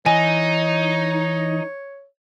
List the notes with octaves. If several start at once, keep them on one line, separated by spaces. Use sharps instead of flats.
E3 D#4 C#5 G#5